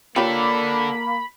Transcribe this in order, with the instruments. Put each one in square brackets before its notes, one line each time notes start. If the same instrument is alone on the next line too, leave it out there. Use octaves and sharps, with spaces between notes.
[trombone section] A#3 [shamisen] F4 G4 C#5 [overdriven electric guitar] A4 D5 [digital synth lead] B5